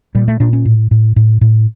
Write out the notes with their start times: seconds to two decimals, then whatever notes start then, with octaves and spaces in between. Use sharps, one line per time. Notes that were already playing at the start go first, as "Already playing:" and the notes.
0.15 A#2 G3
0.28 A3
0.40 A#2 D4
0.53 C#4
0.65 A2
0.91 A2
1.16 A2
1.41 A2